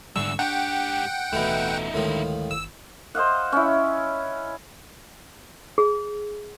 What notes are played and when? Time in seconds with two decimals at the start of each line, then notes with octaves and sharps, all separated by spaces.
0.16 E2 G#2 D3 G3 D4 C#6 E6
0.39 G#2 D4 G4 F#5 G5
1.33 D1 B2 E3 A3 D#4 E4
1.94 D2 A2 D#3 F3 G#3
2.51 G1 E6
3.15 C5 D#5 F5 F#5
3.52 C#4 E4
5.78 G#4